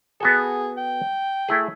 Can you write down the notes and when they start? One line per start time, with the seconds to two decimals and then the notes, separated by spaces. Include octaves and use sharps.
0.21 B3 F#4 G#4 A4
0.78 G5
1.49 A3 E4 G#4